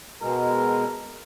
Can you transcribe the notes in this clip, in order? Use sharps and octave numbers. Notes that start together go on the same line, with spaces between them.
B2 G#3 A#4